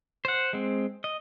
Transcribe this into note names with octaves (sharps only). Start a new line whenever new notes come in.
C5 F#5
G#3 C4
D#5